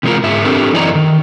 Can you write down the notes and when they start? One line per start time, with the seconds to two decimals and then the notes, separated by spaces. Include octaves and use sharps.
0.03 C3 E3 G#3 B3 F4 A#4
0.23 G#2 G#4 E5
0.45 C4 D4 G4 A4 A#4
0.72 F#2 E3 E4 D5 D#5 A#5
0.95 D#3